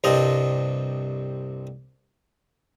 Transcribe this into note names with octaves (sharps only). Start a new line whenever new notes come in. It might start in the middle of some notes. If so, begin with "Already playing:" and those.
C2 G2 C4 D#5 A5